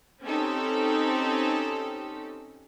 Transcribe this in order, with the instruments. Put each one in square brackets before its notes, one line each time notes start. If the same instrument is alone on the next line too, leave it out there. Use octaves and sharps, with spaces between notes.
[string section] C4 C#4 D#4 G4 A4